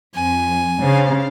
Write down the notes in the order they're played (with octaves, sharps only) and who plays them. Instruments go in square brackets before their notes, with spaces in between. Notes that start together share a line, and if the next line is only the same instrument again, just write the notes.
[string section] F2 [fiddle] G#5
[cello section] C#3 [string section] D4 C5 F5